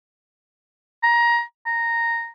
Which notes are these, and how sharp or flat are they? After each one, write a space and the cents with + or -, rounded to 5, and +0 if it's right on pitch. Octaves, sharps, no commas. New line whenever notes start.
A#5 +20
A#5 -5